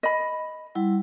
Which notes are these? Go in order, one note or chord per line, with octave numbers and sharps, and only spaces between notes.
D#5 B5
G3 E4 F#5